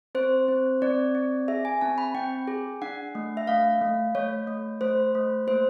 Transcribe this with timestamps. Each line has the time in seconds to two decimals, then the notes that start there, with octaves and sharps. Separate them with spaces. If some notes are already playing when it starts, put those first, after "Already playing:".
0.15 C4 C5
0.48 C4
0.82 C4 D5
1.15 C4
1.48 G#4 E5
1.65 G#5
1.81 C4 A5
1.98 B5
2.15 C4 G5
2.47 G#4
2.82 D4 F#5
3.15 A3
3.37 E5
3.47 A3 F5
3.81 A3
4.15 A3 C#5
4.47 A3
4.81 A3 C5
5.15 A3
5.47 A#3 C5